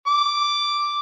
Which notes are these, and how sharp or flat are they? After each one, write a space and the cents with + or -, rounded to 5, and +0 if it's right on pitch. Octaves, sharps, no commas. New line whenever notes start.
D6 +0